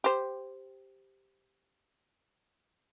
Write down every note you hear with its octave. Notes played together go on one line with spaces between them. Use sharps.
G4 C5